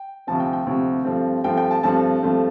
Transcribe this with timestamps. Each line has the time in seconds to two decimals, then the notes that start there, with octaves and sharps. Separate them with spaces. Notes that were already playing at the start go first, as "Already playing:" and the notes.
Already playing: G5
0.27 D2 C3 F3 C4 A5
0.40 G5
0.53 G5
0.66 D2 C3 F3 C4
1.05 G2 F3 A3 C4
1.44 G2 F3 A3 C4 G5
1.57 G5
1.71 A5
1.83 G2 F3 A3 C4 A5
2.23 G2 F3 A3 C4